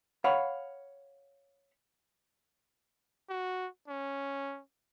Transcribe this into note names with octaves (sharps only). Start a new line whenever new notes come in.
C#5 F5 F#5 B5
F#4
C#4